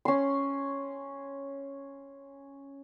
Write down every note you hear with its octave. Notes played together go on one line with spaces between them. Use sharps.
C#4 C6